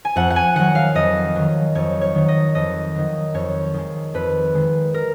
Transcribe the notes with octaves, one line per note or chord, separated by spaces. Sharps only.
G#5
F2 F#5
F#5
G#5
D#3 F#3 F#5
F5
F2 D#5
D#3 F#3
F2 C#5
C#5
D#3 F#3
D#5
F2 D#5
D#3 F#3
F2 C#5
D#3 G#3
F2 B4
D#3 G#3
A#4